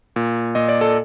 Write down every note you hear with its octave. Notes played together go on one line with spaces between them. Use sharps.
A#2
A#2 D#5
D5
A4